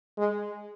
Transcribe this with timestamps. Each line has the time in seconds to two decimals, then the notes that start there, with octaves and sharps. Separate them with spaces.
0.18 G#3